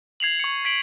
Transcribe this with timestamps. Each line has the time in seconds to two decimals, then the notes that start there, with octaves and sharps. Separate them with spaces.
0.20 G#6 C7 F7 F#7
0.40 C#6 C#7
0.65 G#6 B6 D7 F#7